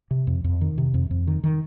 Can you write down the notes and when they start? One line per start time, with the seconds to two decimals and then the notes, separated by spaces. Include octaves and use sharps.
0.11 C3
0.27 F2
0.44 F2
0.61 D#3
0.78 C3
0.94 F2
1.11 F2
1.27 D#3
1.44 D#3